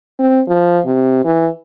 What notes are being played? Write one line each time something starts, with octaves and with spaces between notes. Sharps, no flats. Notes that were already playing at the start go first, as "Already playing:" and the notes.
C4
F3
C3
E3